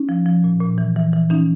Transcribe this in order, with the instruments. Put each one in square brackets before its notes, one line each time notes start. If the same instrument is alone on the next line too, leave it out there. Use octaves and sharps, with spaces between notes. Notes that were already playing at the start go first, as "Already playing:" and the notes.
Already playing: [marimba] C#4 D#4
F3
F3
A#2
A#2
E3
E3
E3
E3 C#4 D#4